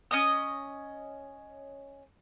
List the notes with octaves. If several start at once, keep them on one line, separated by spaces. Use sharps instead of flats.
C#4 D#5 D#6